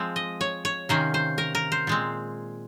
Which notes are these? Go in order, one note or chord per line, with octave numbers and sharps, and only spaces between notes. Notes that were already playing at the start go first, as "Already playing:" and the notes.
Already playing: F3 G#3 C4
D#5
C#5
C#5
C3 D#3 A#3 C#4 C5
C5
A#4
A#4
C5
A#2 G#3 C4